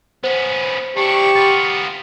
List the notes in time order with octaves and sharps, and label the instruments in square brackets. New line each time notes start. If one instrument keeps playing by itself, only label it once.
[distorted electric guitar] B3 C#4 [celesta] C5
[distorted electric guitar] D4 E4 [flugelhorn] G4 [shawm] C#6
[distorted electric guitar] B3 F4 [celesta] A6